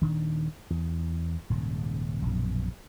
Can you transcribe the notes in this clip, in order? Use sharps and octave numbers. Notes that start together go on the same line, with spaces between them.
D#1 D#3 D4
E2
D#1 G#2 C#3
A#1 F#2 B2